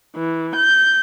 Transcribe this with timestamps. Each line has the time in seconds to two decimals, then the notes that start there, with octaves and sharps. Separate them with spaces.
0.16 E3
0.56 G6